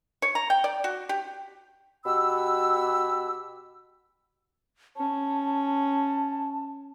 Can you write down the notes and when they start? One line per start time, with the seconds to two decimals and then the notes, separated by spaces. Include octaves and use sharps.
0.22 C#5
0.35 A#5
0.50 G5
0.64 D5
0.84 F#4
1.09 G4
2.05 B2 G4 B5 E6
4.97 C#4 A5